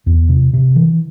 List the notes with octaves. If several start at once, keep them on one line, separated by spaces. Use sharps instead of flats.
E2
C3
C3
E3